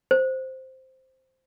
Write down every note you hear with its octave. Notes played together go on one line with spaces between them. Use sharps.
C5